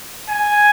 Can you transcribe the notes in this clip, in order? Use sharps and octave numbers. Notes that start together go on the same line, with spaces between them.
G#5